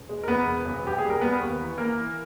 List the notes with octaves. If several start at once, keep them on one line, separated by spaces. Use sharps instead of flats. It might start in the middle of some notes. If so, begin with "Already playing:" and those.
Already playing: E1
G#3
A#4
E2 B3 B4
E1
B1
B1 G4
G#4
G3
A#4
G3 B3 B4
D#2
E3
E3 A#3 A#4
E3